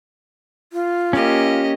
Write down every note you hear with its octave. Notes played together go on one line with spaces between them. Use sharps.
F4
A#3 C#4 G4 D#5